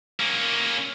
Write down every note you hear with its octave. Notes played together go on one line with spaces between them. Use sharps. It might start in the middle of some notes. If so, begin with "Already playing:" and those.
A#3 C#4